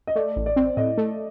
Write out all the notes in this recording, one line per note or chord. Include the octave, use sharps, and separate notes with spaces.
D#5
A3 D5
A1
D5
C4
A2 D#5
A3